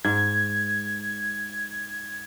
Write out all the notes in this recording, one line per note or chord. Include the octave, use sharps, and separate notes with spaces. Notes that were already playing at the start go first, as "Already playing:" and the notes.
G#2 G#6